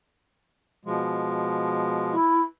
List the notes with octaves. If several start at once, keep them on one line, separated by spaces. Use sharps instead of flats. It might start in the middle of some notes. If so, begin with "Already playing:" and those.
B2 F3 G#3
E4